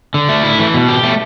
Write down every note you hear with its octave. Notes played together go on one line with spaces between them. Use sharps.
D3
A3
E4
E3
B2
G4
A3